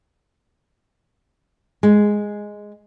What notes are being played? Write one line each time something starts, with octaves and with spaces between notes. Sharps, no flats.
G#3